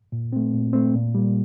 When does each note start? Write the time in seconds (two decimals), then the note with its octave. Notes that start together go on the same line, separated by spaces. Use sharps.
0.12 A#2
0.33 A3 C4
0.54 A#2
0.73 A3 C4
0.94 A#2
1.15 G3 A#3